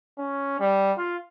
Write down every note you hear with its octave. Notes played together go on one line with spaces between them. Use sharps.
C#4
G3
F4